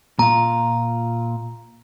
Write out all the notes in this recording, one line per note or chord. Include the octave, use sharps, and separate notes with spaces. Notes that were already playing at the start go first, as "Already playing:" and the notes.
A#2 F4 A#5